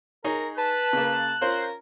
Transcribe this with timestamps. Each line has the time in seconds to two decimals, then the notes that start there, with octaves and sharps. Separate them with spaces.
0.24 D#4 G#4 A#4 C#5
0.58 B4 A5 F#6
0.93 C#3 A#3
1.41 C#4 F4 A#4 C5